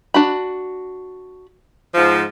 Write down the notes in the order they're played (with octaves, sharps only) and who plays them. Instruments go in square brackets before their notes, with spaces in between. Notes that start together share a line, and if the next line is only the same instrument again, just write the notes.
[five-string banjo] D4 F#4 B5
[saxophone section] G#2 F3